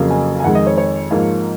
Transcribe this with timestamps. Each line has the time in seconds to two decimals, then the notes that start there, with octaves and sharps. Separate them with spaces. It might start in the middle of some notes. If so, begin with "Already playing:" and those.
Already playing: F2 C#3 F#3 A#3
0.10 G#5
0.40 G#5
0.44 F2 D#3 G#3 F#5
0.55 D#5
0.67 C#5
0.77 C#5
1.11 G#2 F3 A#3